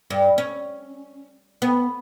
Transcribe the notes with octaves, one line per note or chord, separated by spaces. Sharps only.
G2
C#4
B3